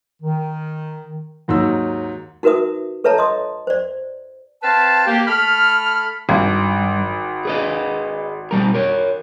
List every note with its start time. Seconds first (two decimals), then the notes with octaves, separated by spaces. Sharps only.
0.22 D#3
1.48 D#2 G#2 F#3 E6
2.43 D#4 F#4 A#4 B4 E5 D#6
3.04 A4 B4 C#5 E5 A5 A#5
3.18 D#5 C6 D#6
3.67 C5 D5
4.62 C4 B4 F5 A5
5.06 A#3 G4
5.26 A3 B5 F6
6.29 G#1 G2
7.45 G#4 B4 D#5
8.51 B2 G3 A#4
8.74 A#4 C#5